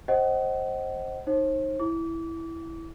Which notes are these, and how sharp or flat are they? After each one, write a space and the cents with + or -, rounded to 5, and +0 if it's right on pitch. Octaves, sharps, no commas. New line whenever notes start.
C5 +15 D#5 +0 F#5 +40
D#4 +0 C5 +45
E4 +0 D6 -30